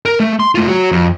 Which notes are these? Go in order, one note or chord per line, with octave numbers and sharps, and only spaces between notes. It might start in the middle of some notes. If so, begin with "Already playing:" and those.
A#4
A3
C6
A3 F4
F#4 C#5
F2